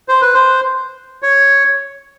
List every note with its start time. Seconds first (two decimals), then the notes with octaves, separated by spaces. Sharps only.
0.09 C5
0.22 B4
0.34 C5
1.22 C#5